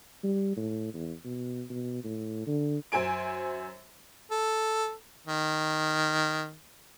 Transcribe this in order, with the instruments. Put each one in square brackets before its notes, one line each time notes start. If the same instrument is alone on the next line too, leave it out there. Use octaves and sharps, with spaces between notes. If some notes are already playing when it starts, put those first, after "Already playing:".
[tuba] G3
A2
E2
B2
B2
A2
D3
[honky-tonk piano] F#2 C5 G#5 D7
[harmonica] A4
D#3